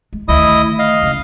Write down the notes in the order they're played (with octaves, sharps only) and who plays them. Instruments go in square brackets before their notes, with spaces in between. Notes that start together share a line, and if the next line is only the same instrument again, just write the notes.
[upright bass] G#3
[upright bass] D2 D#3 [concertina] E4 D#5 D#6
[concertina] D#5 F5
[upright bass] C#2 D#3